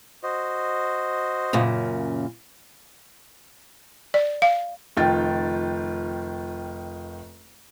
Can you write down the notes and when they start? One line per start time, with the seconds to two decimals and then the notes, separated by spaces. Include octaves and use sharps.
0.23 F#4 C5 D#5
1.53 F#2 A#2 C#3
4.14 D5
4.42 F5
4.97 F1 D#3 F4 G5 A6